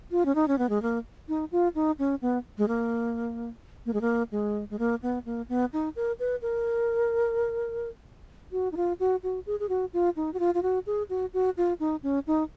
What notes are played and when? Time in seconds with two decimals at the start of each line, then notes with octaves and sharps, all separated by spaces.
0.11 F4
0.25 C#4
0.35 D#4
0.48 C#4
0.58 B3
0.69 G#3
0.82 A#3
1.28 D#4
1.52 F4
1.75 D#4
1.99 C#4
2.22 B3
2.58 G#3
2.68 A#3
3.86 A#3
3.93 G#3
4.01 A#3
4.32 G#3
4.70 G#3
4.79 A#3
5.03 B3
5.26 A#3
5.49 B3
5.73 D#4
5.96 A#4
6.19 B4
6.42 A#4
8.52 F#4
8.72 D#4
8.77 F4
9.00 F#4
9.23 F#4
9.46 G#4
9.60 G#4
9.69 F#4
9.93 F4
10.16 D#4
10.34 F#4
10.40 F4
10.55 F4
10.63 F#4
10.87 G#4
11.09 F#4
11.34 F#4
11.57 F4
11.80 D#4
12.03 C#4
12.27 D#4